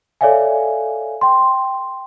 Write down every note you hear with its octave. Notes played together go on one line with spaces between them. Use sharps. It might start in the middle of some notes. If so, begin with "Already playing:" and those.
A4 C#5 D5 E5 F5 G#5
G5 C6